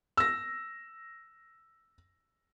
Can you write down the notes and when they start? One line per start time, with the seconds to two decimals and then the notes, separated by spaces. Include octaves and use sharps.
0.17 E6 A#6